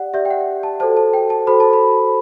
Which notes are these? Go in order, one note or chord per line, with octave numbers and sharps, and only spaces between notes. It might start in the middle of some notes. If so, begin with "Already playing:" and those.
Already playing: G4 D5 F#5
G4 D5 E5
G5
F#5
A5
F#4 A4 C5 A5
A5
G5
A5
F#4 A4 C5 B5
A5
B5